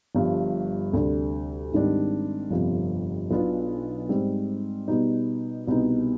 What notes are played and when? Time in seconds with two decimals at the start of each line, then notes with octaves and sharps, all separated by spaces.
0.15 G1 G2 F3
0.93 D2 C3 G3 D4
1.72 G#1 G#2 D#3 G3 D4
2.51 G1 F2 C3 F3
3.31 B1 B2 B3 D4 F4
4.09 G#2 G3 C4
4.88 B2 G3 B3 D#4
5.67 C2 B2 B3 D#4